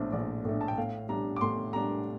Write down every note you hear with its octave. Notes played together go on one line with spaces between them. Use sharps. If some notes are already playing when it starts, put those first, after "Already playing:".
Already playing: A#1 A2 A3 D4 C5
A#1 D5
A2 A3 D4
A5
G5
A2 F5
G3 D4 A#5
D6
A2 C6
G3 D4 A#5